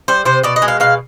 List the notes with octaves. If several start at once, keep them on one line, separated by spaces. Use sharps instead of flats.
G3 C5
C3 C5
B2 D5
D#5
G#3
F5
B2 F5